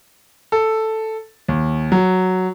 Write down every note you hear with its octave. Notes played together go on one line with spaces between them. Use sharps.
A4
D#2
F#3